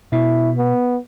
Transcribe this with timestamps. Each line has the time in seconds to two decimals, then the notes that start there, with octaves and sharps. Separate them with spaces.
0.12 B2 E4
0.58 B3